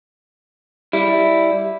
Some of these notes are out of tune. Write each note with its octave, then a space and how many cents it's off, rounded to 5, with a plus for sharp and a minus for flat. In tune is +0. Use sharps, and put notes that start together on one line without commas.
G3 +0 E4 +0